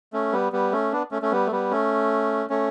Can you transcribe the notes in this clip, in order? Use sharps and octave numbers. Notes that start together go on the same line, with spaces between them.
A3 C#4
G3 B3
G3 B3
A3 C#4
B3 D4
A3 C#4
A3 C#4
G3 B3
A3
G3 B3
A3 C#4
A3 C#4